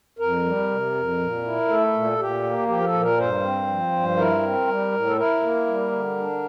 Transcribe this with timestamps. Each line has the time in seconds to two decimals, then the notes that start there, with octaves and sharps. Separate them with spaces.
0.19 F2 A#4
0.44 G3
0.69 C3
0.94 F2
1.19 A#2
1.44 E4
1.68 A3 A4
1.93 A#2
2.18 A#2 G4
2.43 A#3
2.68 F3 G4
2.80 A#4
2.84 A4
2.93 A#2
3.01 A#4
3.17 G2 C5
3.43 C4
3.67 F3
3.92 G2
4.17 E4 A#4
4.42 C4
4.67 G3
4.92 A2
5.06 A4
5.17 E4 A#4
5.41 A#3
5.67 G3
5.91 D3
6.17 D4